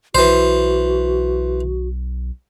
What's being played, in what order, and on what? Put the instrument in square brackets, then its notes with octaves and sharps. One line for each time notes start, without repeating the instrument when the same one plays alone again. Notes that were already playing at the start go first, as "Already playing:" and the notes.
[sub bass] B1 [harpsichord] E3 C5 [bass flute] F#4